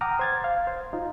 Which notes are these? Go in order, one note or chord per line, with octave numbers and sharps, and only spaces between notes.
F#5 G5 A#5 D6 D#6 F6
C5 G#6 A6
F5
C5
D#4 F4